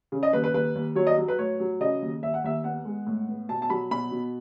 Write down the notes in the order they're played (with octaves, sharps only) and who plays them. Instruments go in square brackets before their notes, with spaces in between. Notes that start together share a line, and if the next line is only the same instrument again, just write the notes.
[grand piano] C#3
D#5
D#2 B4
B4
D#2 B4
D#2
F#3 C#5
D#5
F#3
B4
A2 C#5
F#3
C#3 D#5
D#2
D#2 E5
F#5
D#2 E5
B3 F#5
G#3
A2
B3
B2 A5
A5
F#3 B5
B2 B5
B2